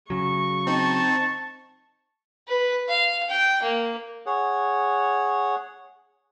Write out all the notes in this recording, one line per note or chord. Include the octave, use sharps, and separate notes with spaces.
C#3 F#3 C#6
C4 D#4 A5
B4
F5
G5
A#3
G#4 C#5 F#5